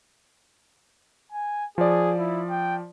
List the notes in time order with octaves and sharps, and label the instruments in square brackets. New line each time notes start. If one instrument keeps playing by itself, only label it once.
[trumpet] G#5
[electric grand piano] F3 D5 [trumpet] G#4
[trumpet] E4
G5